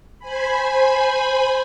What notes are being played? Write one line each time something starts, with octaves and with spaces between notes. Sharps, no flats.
C5 G#5 B5